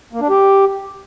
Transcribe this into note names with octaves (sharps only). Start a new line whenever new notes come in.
A#3
D4
G4